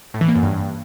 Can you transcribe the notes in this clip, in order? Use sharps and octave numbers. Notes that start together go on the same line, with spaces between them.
A2
E3
A#3
F#2
G2